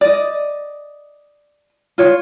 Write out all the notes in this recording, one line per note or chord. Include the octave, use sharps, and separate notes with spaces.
D5 D#5
F4 C#5